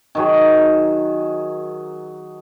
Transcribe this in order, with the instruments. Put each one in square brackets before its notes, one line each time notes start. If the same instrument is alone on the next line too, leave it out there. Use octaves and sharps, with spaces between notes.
[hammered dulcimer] D#3 F#3 G#4